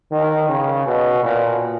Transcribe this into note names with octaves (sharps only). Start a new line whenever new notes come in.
D#3
C#3
B2
A#2